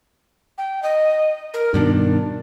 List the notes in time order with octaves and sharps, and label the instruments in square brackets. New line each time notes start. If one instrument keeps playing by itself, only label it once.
[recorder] G5
D#5
A#4
[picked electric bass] G2 B2 D#3 [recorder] D4